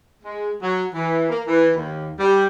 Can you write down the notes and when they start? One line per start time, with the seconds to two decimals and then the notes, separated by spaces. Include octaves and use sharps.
0.23 G#3
0.62 F#3
0.94 E3
1.29 A#3
1.46 E3
1.75 D#2
2.19 G3